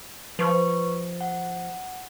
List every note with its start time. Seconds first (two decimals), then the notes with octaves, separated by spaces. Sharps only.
0.39 F3 B4 C#6
1.21 F#5